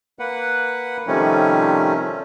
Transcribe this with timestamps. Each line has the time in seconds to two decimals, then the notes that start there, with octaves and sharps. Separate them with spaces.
0.19 A#3 B4 F#5
1.07 C3 D#3 F3 G3 A3 C#4